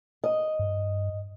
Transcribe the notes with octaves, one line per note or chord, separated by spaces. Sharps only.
D#5
G2